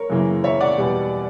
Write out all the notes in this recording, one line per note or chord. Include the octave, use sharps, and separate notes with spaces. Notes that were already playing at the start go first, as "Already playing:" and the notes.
Already playing: A#4 C#5
F#2 C#3 E3 A#3
C#5 E5
D5 F#5
E2 B2 G3 B3